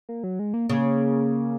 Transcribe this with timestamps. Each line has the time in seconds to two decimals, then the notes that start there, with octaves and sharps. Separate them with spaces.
0.09 A#3
0.24 F#3
0.39 G#3
0.54 A#3
0.69 C#3 A#3